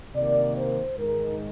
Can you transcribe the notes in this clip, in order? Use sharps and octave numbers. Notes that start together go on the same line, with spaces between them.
C3 D#3 A#3 D5
C5
G#2 D#3 G#3 D#4 A#4